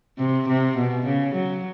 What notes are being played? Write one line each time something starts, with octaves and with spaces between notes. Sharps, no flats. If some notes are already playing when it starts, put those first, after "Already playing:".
C3
C3
B2
C#3
F#3